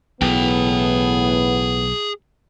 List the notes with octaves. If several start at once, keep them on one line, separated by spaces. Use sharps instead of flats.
B1 A2 E3 B3 G#4 G5